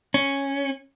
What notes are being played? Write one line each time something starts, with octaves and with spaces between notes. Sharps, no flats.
C#4